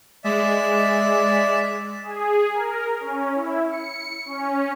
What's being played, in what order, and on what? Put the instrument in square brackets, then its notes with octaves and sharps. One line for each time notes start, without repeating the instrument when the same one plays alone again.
[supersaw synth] G#3 [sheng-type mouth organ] D5 E5
[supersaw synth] G#4
A#4
C#4
E4
C#7
C#4